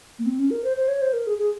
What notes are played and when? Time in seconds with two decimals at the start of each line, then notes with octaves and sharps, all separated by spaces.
0.19 A#3
0.26 C4
0.39 C#4
0.50 A#4
0.64 C5
0.77 C5
0.88 C#5
1.02 C5
1.13 A#4
1.27 G#4
1.38 G#4